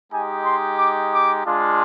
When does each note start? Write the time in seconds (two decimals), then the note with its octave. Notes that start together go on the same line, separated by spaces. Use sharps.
0.11 G#3 D#4 G4 G#5
0.45 C6
0.78 D6
1.12 D6
1.45 G#3 D4 F4